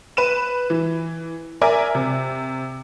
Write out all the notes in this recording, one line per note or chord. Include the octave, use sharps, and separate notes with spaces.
B4 D#7 E7
E3
A#4 D5 E5 G#5
C3